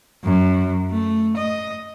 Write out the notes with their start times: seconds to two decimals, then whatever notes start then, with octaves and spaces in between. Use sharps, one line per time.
0.24 F#2
0.91 A3
1.37 D#5